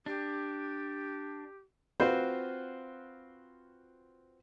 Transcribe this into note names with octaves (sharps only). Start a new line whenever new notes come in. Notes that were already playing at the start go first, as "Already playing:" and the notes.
D4 G4
C4 F4 F#4 B4 C5